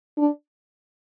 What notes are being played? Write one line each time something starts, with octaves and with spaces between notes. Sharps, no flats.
D4